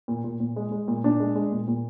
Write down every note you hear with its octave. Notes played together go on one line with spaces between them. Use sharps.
A#2
A#2
A#2
G#3
G#3
A#2
A#2 D4
G#3
G#3
A#2
A#2